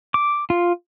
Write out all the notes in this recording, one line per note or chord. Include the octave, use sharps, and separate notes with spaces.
D6
F4